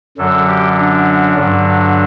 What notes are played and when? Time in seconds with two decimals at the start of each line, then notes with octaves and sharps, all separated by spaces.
0.17 F#2 D3 F#3 A4
0.47 G4
0.77 D4
1.35 G2 D3 F#3